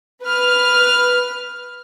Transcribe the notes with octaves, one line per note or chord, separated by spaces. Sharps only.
B4 F6